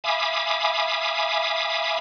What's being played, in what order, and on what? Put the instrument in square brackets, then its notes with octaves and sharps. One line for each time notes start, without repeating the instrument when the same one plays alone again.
[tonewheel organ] E5 F5 G#5 B5 D6 D#6